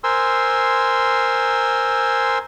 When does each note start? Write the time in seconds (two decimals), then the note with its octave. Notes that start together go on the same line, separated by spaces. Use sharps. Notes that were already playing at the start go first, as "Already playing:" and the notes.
0.04 A#4 C5 G#5 C6 E6